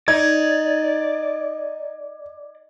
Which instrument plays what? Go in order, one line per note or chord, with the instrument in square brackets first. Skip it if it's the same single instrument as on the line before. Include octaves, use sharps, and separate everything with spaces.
[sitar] D#4 [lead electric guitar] D5 [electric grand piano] G#6